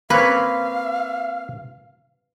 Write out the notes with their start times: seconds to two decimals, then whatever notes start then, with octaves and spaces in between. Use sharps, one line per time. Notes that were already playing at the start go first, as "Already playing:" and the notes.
0.10 A#3 C4 B4 C#5 F5